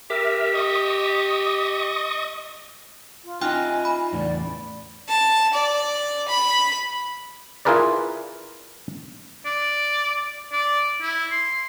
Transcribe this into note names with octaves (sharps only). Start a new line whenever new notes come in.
G4 A#4 E5
D#5 C#6 D#6
F4
D#4 F4 D#5 G5 G#5 F6 F#6
B5
E2 A2 D5
A5
D5
B5
E4 F4 G#4 A#4 B4 D5
D5
D5
E4
C6